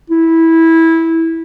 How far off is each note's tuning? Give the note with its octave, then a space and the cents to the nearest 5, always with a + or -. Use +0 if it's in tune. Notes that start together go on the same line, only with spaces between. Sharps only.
E4 -15